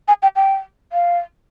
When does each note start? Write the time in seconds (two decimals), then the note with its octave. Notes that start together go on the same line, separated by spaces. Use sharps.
0.08 G#5
0.22 G5
0.36 G5
0.93 F5